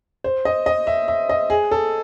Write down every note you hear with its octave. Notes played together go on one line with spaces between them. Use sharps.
C5
D#5
D#5
E5
E5
D#5
G#4
A4